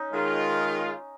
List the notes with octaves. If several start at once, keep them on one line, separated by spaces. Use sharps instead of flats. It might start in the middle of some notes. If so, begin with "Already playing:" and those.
Already playing: C#4 D#4
D#3 G#3 F4